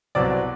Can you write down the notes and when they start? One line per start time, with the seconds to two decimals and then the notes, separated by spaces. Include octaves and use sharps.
0.15 C2 B2 F#3 C4 D5 D6